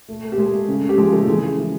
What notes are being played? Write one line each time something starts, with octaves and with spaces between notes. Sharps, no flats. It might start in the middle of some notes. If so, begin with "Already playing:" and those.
A3
A3
G4
G#3 A3 G#4
A3
C#3
C#3
G4
F3 G#3 G#4
F3 A3 A4
E3 G#3 G#4
C#3
E3